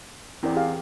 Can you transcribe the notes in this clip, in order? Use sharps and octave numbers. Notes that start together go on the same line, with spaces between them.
E2 C4 E4 A#4 D5
G4 G#4 F5